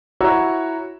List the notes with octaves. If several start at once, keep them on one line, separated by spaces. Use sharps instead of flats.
E4 F#4 C#5 A#5 E6